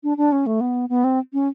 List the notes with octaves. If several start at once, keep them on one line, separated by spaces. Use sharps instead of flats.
D4
D4
C#4
A3
B3
B3
C4
C#4